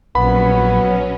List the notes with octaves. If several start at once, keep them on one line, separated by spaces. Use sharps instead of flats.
A#1 F#3 B3 C#4 B5